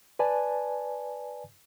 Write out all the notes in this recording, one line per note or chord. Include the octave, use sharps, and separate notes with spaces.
B4 D5 G#5 A5